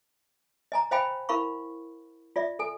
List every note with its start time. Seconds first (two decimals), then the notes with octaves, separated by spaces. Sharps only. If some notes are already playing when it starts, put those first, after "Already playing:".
0.72 D#5 G#5 A#5
0.91 C5 D#5 F5 G5 G#5 B5
1.29 E4 A#4 F5 B5 C#6
2.36 F4 D5 E5
2.59 A4 G#5